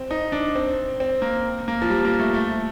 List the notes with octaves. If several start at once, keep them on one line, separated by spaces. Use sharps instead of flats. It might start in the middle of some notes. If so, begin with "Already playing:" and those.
Already playing: C4
D#4
D4
C4
C4
A#3
A#3
F3
G3
A#3
A3
A3